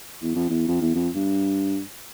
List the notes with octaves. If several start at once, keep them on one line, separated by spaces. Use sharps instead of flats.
E2
F2
E2
F2
E2
F2
G2